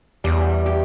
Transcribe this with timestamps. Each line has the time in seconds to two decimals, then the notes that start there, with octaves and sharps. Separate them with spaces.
0.24 E2 G3
0.66 G4